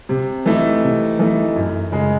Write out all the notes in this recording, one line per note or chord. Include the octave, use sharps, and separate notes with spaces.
C3
E3 A3 D#4
C3
E3 A3 D#4
F#2
C#3 G#3